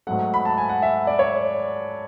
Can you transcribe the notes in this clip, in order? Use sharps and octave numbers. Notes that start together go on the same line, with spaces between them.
G#2 F#3 A3 F#5
B5
A5
G#5
F#5
E5
D5
C#5